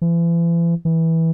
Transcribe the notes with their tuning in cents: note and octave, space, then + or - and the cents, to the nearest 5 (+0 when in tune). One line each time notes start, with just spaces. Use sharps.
E3 +40
E3 -15